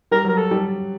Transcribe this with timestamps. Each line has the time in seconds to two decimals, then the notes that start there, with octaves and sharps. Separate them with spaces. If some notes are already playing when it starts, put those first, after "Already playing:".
0.11 G3 A#4
0.25 F#3 A#4
0.38 A4
0.51 G3